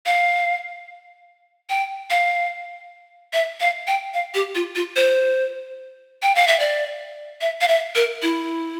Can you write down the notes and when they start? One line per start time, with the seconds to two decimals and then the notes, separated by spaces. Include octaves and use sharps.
0.06 F5
1.69 G5
2.10 F5
3.33 E5
3.61 F5
3.87 G5
4.14 F5
4.34 G4
4.55 F4
4.75 F4
4.96 C5
6.22 G5
6.35 F5
6.48 E5
6.60 D5
7.41 E5
7.61 F5
7.68 E5
7.95 A#4
8.22 E4